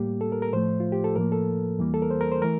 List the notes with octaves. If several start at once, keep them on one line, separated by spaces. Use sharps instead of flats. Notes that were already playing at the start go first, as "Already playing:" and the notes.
Already playing: A2 G3 A#3 G4
A4
A#4
A#4
A2 F3 A3 C5
F4
G4
A4
A2 F3 A#3 A#4
A4
E2 E3 G3 A#3
A4
A#4
C5
A#4
C5
E3 A3 A#4